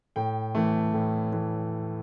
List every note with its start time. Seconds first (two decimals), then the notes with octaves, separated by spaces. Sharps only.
0.16 A2 G5
0.55 E3 A3
0.94 A2
1.32 E3 A3